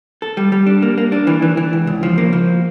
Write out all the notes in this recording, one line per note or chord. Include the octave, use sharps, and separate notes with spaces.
A4
G3
G3
D4
A#3
A#3
D4
E3
E3
E3
C#2
C#2
F3
A#3
F3